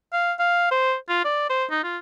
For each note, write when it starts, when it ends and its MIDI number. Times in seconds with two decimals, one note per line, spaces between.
0.13 0.33 77
0.39 0.67 77
0.71 0.95 72
1.09 1.25 65
1.25 1.46 74
1.50 1.65 72
1.70 1.82 63
1.84 1.98 65